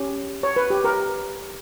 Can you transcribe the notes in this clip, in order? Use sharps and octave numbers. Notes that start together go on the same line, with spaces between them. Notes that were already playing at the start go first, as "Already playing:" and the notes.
Already playing: C#4 G4
C#5
B4
G4
A#4